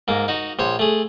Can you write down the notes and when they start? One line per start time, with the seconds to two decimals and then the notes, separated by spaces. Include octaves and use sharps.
0.08 G#2 A#3
0.28 D#4 F#4
0.59 A#1 C5 C#5
0.79 A3 G#4